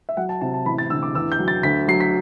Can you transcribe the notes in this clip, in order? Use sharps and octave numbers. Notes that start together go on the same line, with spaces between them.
E5
F#3 F#5
A5
C3 A5
A5
A1 B5
A6
D3 E6
D6
E2 E6
G6
F#3
A6
D2 B6
F#3 C7
B6